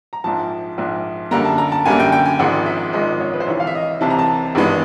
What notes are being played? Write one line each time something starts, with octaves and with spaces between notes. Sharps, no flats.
A#5
A#1 G#2 F3 A5
A#1 G#2 F3
F#2 D3 G3 A#3 A#5
A5
A#5
A5
F#2 D3 G3 A#3 G#5
G5
G5
G#5
G#1 G#2 F3 G#3 F#5
E5
G#1 G#2 F3 G#3 D#5
C#5
B4
C5
C2 C3 E3 C#5
F5
E5
D#5
C2 C3 E3 A5
A#5
A5
G#1 G2 E3 G#3 B3